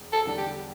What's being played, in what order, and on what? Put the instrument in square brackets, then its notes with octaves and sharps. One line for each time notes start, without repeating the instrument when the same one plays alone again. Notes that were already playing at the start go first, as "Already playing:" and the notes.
Already playing: [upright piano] E1
[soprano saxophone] A4
[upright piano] E2 D3 G3 D4
[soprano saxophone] G4